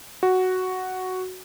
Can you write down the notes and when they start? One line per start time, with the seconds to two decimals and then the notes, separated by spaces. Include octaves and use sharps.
0.23 F#4